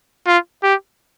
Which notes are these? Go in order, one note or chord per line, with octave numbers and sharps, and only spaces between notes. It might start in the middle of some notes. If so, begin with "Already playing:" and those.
F4
G4